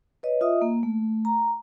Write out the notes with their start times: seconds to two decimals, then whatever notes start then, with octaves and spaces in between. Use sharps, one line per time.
0.23 B4 C#5 D#5
0.41 F4 D#5 E5 D#6
0.62 A#3
0.83 A3
1.25 A#5